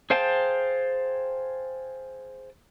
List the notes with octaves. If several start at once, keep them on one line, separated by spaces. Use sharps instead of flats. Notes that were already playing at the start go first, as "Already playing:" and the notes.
G#4 C5 F5 G5 A5